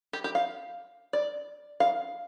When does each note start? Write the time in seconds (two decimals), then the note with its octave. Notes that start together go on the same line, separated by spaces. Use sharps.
0.13 G4
0.24 G4
0.35 F5
1.13 D5
1.80 F5